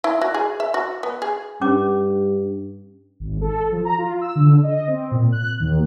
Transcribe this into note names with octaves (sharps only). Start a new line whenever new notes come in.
E4
F#4
G#4
E5
F#4
B3
G#4
G2 C#4 D6
G#1
A4
F3
A#5
F4
E6
D3
D#5
C4
A#2
F#6
D#2